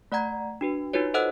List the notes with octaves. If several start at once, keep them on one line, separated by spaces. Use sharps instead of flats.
A3 D5 F#5 A#5 G#6
D4 F#4 B4
D#4 F4 F#4 B4 C#5
A4 C5 D#5 F#5 E6 F#6